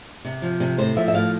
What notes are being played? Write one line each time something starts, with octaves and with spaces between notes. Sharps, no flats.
C3
F3
C3
A2 C5
F3 E5
E5
A2 F5